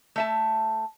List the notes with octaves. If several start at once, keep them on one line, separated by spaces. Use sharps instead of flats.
A3 E5 A5